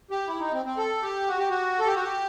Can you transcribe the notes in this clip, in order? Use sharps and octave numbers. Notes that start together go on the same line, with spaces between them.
G4
E4
D#4
C4
C4
A4
G4
F#4
G4
F#4
A4
G4
F#4
G4